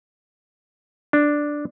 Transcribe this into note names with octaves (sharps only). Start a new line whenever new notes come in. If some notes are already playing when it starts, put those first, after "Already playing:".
D4